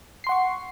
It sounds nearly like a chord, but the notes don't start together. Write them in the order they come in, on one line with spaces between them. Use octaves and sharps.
C7 C6 F#5 C#6